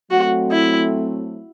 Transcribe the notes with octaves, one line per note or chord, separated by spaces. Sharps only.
F#3 A3 C4 F#4
E4